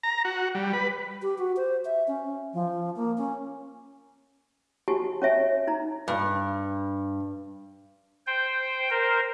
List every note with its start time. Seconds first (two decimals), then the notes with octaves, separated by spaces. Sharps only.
0.03 A#5
0.25 F#4
0.55 G3
0.73 B4
1.22 G4
1.38 F#4
1.57 C5
1.85 E5
2.08 C#4
2.54 F3
2.96 A#3
3.18 C#4
4.88 F#4 G4 G#5 A5 C#6
5.22 C#4 C#5 E5 G#5
5.67 D#4 A#5
6.08 G2
8.27 C5 G5
8.90 A#4 C5